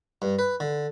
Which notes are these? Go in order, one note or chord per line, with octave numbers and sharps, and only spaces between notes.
G2
B4
D3